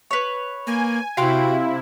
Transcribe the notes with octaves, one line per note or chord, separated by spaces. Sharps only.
B4 C#5
A#3 G#5
C3 E4 F#4 F5 G5 C6